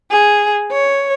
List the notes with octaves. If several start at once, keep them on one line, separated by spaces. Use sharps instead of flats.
G#4
C#5